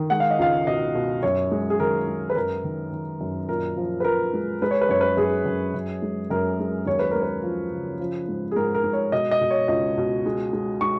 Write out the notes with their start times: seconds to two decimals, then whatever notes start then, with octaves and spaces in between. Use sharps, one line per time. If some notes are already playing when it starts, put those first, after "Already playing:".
Already playing: D#3
0.10 G#3 F#5
0.20 F5
0.30 D#5
0.39 C#2 F5
0.67 B2 D#5
0.95 B2
1.23 F#2 C#5
1.51 G#3
1.70 G#4
1.80 D#3 A#4
2.07 G#3
2.30 B4
2.35 F#2 A#4
2.64 D#3
2.92 D#3
3.21 F#2
3.48 A#2 A#4
3.77 F3
4.00 B4
4.04 F3 A#4
4.33 G#3
4.62 G#3 B4
4.71 C#5
4.81 B4
4.89 F#2 C#5
5.01 B4
5.17 F#2 G#4
5.46 F#2
5.74 F#2
6.02 G#3
6.30 F#2 A#4
6.59 G#3
6.86 D#2 C#5
6.99 B4
7.11 G#3 A#4
7.22 B4
7.43 F3
7.71 C#3
8.00 F3
8.28 G#2
8.51 G#4
8.56 G#2 A#4
8.75 A#4
8.84 G#2
8.93 C#5
9.12 B2 D#5
9.31 D#5
9.41 B2
9.51 C#5
9.68 C#2 D#5
9.98 B2
10.26 G#3
10.53 G#3
10.81 G#3 C#6